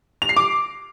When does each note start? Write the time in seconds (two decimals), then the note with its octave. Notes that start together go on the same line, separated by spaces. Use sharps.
0.22 F7
0.29 C7
0.37 D6